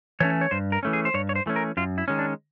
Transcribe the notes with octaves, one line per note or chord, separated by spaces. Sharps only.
E3 A3 C#4 C#5
C#5
G2 C5
A#4
E3 A3 C#4
G#4
C5
G2 C#5
C#5
C5
E3 A3 C#4
A#4
F#2 F4
E4
D#3 G#3 C#4
D4